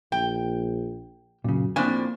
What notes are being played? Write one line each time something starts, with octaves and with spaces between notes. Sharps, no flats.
A#1 G5
F#2 A#2 C#3
A2 F3 A#3 C4 D4 G#5